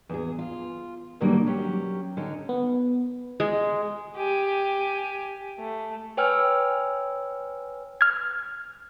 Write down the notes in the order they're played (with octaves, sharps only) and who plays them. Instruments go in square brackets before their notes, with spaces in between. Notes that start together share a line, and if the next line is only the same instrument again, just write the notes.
[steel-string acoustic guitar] E2 G#4
F4
B2 D3 D#3 F#3 G3 A#3
F#3 C#4 G4
D3 C#4 D#4
[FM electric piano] B3
[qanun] G#3
[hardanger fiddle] G4 G#5
A3
[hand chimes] B4 C#5 G5 G#5 E6 F6
[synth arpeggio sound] F6 G#6